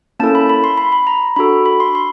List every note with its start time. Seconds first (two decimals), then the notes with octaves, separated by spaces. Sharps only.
0.20 A#3 C#4 E4 A4 A5
0.35 B5
0.49 B5
0.64 C6
0.78 B5
0.92 B5
1.07 A#5
1.36 D4 F#4 A4 B5
1.66 B5
1.80 C6
1.95 C6